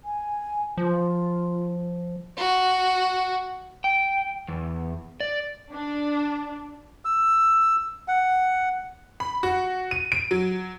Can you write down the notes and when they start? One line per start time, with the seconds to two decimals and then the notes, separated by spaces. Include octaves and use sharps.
0.05 G#5
0.78 F3 F4
2.38 F#4
3.84 G5
4.48 E2
5.20 D5
5.72 D4
7.05 E6
8.08 F#5
9.20 B5
9.43 F#4
9.91 D#7
10.12 D7
10.31 F#3